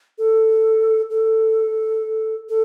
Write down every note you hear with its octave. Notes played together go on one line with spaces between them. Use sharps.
A4
A4
A4